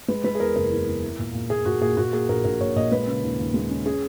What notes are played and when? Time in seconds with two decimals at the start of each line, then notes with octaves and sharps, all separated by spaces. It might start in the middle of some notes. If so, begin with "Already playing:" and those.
0.08 G#3 B4
0.24 G#3 B4
0.35 G#4
0.40 E2 A#4
0.56 F#1 A#4
0.71 E2
0.87 E2
1.03 E4
1.18 A#2
1.34 A#2
1.50 A#2 G#4
1.65 A#2 F#4
1.81 A#2 G#4
1.97 A#2 F#4
2.13 A#3 G#4
2.29 A#1 A#4
2.44 A#1 A#4
2.60 A#2 C#5
2.76 A#2 D#5
2.92 G#3 B4
3.07 C#3
3.23 D#2
3.39 D#2
3.54 G#3
3.70 C#4
3.85 C#4 G#4